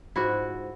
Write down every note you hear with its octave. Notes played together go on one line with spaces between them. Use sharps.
G#2 F3 E4 F#4